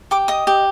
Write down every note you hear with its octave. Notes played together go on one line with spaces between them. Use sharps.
G4 D6
D#5 D#6
G4